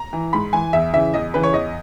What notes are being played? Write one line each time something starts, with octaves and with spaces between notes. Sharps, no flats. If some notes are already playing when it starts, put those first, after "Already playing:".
Already playing: A#5
E3
G#2 B5
E3 G#5
E2 E5
C#3 E3 E5
E2 D#5
C#3 E3 B4
C#5
E2 D#5